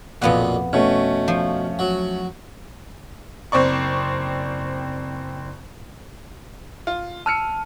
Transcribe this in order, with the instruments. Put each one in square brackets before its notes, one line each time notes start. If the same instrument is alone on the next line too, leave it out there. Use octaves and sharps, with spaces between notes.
[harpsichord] B1 A#2 [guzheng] F2 B3 F#5
[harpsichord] B2 [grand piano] A3 C#4
[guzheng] F3
[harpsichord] F#3
[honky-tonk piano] F#1 C4 C5 D5 C#6
[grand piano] F4
[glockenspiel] A5 [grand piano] E6 F6 C#7